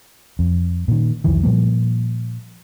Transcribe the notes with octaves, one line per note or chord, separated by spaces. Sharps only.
F2
A#2 D#3
C2 F2 D#3 E3
A#2 F3 G3 A#3